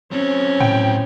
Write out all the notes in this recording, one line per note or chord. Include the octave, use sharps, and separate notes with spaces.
F#3 C4 C#4
A2 G5